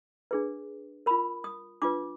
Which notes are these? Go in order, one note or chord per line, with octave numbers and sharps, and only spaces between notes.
D4 G#4 B4
F4 A#4 B5
D#6
D4 F4 B4 D6